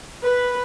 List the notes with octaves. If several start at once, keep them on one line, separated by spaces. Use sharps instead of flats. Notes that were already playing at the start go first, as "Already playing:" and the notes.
B4